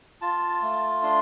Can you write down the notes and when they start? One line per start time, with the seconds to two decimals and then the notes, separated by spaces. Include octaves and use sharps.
0.21 F4 A5
0.62 A3
1.03 D4 C6